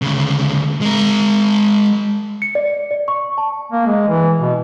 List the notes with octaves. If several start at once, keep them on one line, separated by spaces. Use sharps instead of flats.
D2 C#3
G#3 A#4
C#7
D5
D5
C#6
A5
A#3
G#3
E3
B2